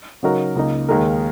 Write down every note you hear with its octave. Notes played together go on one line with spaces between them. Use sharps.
C#3 F#3 D#4 F#4 A#4
C#2 C#3 A#3 D#4
D#2 D#3 G#3 D#4 A#4